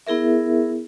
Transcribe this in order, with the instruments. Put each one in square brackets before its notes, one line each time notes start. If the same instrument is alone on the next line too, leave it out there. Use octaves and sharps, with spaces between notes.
[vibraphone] B3 E4 G#4 A#4 E5